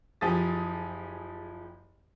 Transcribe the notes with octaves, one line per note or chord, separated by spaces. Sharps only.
F#1 F3 G4 G#4 D#6 A6